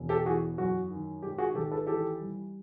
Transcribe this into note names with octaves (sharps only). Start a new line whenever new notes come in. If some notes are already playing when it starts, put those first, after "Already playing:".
Already playing: E1
G4 A4
E2 F#4 G#4
F#2 F#4
D#3
G#2 G4
F#4 G#4
G#1 G4 A4
A4 B4
E3 G4 A4
G3